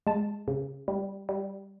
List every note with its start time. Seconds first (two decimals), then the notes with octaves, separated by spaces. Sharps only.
0.07 G#3 A5
0.48 C#3
0.88 G3
1.29 G3